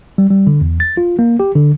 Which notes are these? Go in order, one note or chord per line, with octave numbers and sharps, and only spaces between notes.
G3
G3
D3
E2
A6
F4
A#3
G4
D3